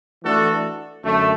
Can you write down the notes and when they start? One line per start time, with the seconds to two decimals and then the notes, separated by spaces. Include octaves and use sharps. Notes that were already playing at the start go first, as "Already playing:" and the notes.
0.23 E3 A3 D4 F#4 A4
1.04 F#2 D3 A3